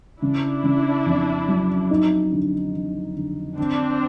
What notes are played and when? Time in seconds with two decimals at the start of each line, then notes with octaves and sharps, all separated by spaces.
0.21 C#3 D4 E4
0.64 C#3
1.06 F2
1.48 F#3
1.91 D#4
2.32 D3
2.74 D3
3.16 D3
3.58 D3 C4 D4